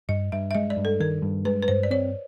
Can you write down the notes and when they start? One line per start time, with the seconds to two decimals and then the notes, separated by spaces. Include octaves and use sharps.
0.09 G2 D#5
0.32 G2 E5
0.51 E5
0.55 G#3 D#5
0.70 D5
0.77 G2
0.85 A4
1.00 D#3 A#4
1.22 G2
1.45 G#3 B4
1.62 B4
1.68 G2 C5
1.83 D5
1.91 C4 C#5